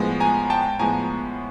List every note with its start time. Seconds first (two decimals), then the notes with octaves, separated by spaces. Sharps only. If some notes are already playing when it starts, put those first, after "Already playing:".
Already playing: A2 F3 G#3 B3
0.20 G#5 A#5
0.50 G5 A5
0.79 A2 F3 G#3 B3 G#5 A#5